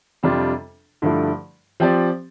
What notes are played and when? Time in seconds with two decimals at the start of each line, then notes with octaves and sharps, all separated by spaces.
0.23 F2 C3 G3 D4 F4
1.02 G2 D3 F3 A3 E4
1.80 F3 C4 G4 D5